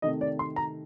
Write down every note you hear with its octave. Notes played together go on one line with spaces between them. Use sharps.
C3 D#3 A3 D#5
D5
C6
A#5